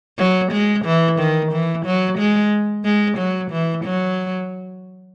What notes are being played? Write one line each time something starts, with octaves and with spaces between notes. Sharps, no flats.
F#3
G#3
E3
D#3
E3
F#3
G#3
G#3
F#3
E3
F#3